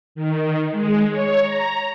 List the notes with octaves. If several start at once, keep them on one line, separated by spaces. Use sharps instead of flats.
D#3
G#3
C#5
A#5